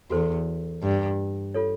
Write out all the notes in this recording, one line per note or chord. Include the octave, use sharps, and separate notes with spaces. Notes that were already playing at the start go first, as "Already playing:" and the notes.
E2 F#4 A4 C5
G2
F4 A4 C#5